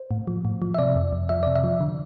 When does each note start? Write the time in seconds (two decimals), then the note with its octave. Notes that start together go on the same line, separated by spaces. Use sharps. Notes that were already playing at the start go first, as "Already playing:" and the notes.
Already playing: C5
0.11 A2
0.27 F3
0.45 A2
0.62 F3
0.74 E5
0.78 C3 D5
0.95 F2
1.13 F2
1.29 F3 E5
1.43 C3 D5
1.55 E5
1.64 F3
1.81 D3